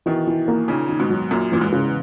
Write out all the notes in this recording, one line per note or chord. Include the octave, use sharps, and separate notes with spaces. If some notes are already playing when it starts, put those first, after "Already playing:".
B2 D#3 E3
E3
A#3
A#2 C#3 D#4
D#3
G#2 B2
F#3
F#2 A#2 A#3
E2 A#2
G#2
C#3